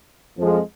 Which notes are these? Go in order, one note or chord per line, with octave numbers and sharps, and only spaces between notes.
F2 F3 G#3